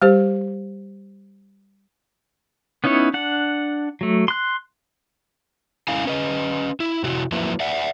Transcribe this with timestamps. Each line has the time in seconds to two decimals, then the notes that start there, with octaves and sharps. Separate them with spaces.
0.02 G3 G4 C5
2.84 B3 C#4 D#4 E4 C#5
3.14 D4 F#5
4.01 F#3 A3
4.28 C6 F#6
5.88 C#4 E4 F5 G#5
6.06 C#4 B4 D#5
6.80 E4
7.04 C3 E4 F#4
7.32 F3 F#3 A#3 E4 B4 E5
7.60 D5 E5 F#5